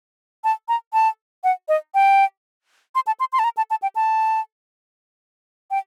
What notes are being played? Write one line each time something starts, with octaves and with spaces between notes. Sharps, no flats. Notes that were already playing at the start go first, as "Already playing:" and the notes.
A5
A#5
A5
F#5
D#5
G5
C6
A5
C6
C6
A5
A#5
A5
A5
G5
A5
G5